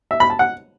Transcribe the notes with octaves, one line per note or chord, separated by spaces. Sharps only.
E5
B5
A5
F#5